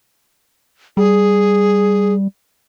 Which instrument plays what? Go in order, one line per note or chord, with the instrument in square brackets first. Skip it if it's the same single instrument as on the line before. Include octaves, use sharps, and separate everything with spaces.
[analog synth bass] G3 [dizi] G#4